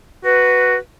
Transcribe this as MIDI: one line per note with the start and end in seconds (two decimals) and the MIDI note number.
0.25 0.76 66
0.25 0.75 71